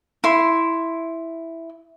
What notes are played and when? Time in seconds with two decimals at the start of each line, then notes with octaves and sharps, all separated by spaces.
0.24 E4 C6